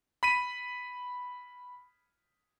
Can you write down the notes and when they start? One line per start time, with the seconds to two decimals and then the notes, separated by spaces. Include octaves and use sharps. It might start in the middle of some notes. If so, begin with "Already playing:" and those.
0.23 B5 B6 D#7